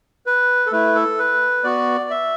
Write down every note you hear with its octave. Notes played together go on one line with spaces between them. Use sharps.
B4
A4
A3 E4 B4
A4
B4
B3 F#4 D5
E5